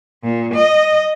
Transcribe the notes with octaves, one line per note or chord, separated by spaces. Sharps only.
A#2
D#5